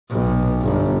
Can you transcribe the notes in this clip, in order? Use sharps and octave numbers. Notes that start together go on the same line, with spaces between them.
B1
G1